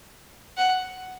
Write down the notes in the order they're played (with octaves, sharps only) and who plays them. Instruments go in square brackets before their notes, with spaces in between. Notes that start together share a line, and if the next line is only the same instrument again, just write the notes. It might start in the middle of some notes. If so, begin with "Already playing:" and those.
[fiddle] F#5